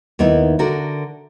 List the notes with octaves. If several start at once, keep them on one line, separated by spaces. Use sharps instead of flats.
D#2 B3 D#4 E4
D3 F#4 A#4